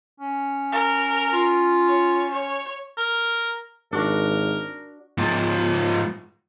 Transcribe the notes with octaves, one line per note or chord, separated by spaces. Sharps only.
C#4
A#4
F4
C#5
C#5
A#4
G#1 D4 F#4 A#4
G#2 F3